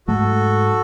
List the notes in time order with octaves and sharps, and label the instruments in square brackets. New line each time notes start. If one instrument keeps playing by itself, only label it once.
[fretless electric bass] G#2 F#3 A3 [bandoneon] F#4 A4